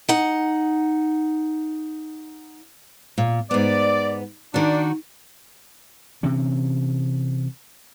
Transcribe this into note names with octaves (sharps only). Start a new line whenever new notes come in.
D#4 F#5
A#2
G#2 B3 D5
D#3 D4 F#4
C3 E3 C4 C#4